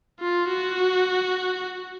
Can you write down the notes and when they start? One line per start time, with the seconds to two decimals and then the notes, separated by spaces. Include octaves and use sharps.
0.20 F4
0.49 F#4